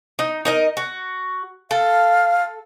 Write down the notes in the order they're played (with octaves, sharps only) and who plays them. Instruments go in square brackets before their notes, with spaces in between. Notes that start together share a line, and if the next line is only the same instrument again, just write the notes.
[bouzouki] D#4
D#4 A#4 D#5
F#4
[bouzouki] A4 [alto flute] F5